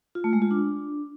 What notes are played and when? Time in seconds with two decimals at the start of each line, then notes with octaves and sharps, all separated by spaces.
0.15 F4
0.24 A3
0.33 G#3
0.42 F4
0.51 D4